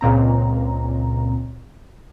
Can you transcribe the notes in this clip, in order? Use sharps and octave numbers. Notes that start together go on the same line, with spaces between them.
C#2 A#2 C4 A#5